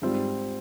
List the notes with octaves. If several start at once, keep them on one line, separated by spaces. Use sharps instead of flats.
G#2 G3 C4 F4